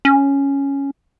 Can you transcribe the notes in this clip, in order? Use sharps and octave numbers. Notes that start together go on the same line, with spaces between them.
C#4